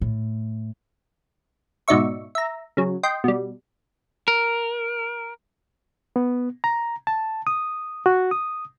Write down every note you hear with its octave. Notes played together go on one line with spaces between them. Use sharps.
A2
G#2 B2 D#4 D5 E5 C#6
E5 A#5
C#3 F#3
D#5 G5 C6
B2 G3
A#4
B3
A#5
A5
D#6
F#4
D#6